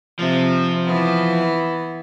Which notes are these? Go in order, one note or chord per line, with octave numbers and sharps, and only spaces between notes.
C3 F3
E3 B3